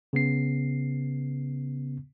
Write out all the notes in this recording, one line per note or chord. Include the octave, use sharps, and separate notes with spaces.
C#3 B3 C7